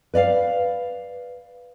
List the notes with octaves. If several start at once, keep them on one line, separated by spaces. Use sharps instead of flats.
B4 D5 E5 F5